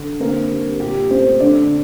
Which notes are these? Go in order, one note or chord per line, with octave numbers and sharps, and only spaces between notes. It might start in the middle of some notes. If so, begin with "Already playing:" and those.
Already playing: D3
A#3 C4 A#4
G3
A#2 G4
A3 C4 C5
D3 D4 D5